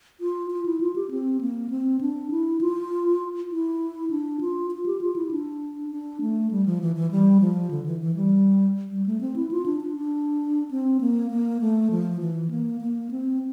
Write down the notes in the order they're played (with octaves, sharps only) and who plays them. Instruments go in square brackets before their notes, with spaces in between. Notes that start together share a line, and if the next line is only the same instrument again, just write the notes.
[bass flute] F4
F4
E4
F4
G4
C4
A#3
C4
D4
E4
F4
E4
D4
F4
F4
G4
F4
E4
D4
D4
A3
G3
F3
E3
E3
G3
F3
D3
E3
E3
G3
G3
A3
C4
E4
F4
D4
D4
D4
C4
A#3
A#3
A3
F3
E3
A#3
A#3
C4